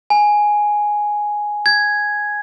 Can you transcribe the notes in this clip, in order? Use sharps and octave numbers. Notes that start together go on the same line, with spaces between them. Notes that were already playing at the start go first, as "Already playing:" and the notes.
G#5
G#6